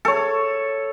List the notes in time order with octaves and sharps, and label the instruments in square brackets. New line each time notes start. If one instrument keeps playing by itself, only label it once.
[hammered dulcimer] A4 C#5